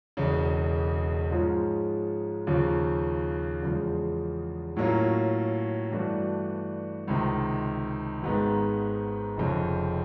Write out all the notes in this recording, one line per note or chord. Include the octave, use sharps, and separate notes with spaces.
E1 E2 C#3
G#2 F3 G#3 C#4 F4
D#2 C#3 F3
E2 C#3 F3 G#3
A2 F#3 A#3 C#4 F4
G2 E3 A3 D4 F#4
C#2 C3 D#3
G#1 G#2 D#3 G#3 B3
F1 F2 C#3